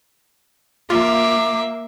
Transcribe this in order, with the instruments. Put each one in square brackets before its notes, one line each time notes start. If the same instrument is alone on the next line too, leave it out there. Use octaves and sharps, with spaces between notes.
[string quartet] A#3 [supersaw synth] F4 [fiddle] E5 [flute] D6